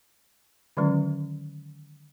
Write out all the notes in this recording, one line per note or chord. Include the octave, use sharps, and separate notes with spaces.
D3 D#3 F#3 G#3 C#4